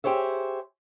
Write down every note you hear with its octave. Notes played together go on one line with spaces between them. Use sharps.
G4 G#4 C5 C#5 E5